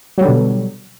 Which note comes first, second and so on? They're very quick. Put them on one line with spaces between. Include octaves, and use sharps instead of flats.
F#3 G3 D3 B2